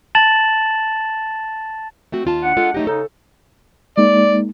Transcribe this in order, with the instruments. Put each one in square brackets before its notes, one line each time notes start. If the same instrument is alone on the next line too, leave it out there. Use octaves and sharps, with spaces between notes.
[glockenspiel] A5 A6 E7 F#7
[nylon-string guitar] A3 C4 F#4
D#2 F4 A5
[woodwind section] D4 F#5
[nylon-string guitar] G#3 F4 A4
[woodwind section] F#3 D#5 [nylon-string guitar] A3 D#4 G4
[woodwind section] C#3 D#4 [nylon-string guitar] A4
[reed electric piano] G#3 A#3 D#4 [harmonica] D5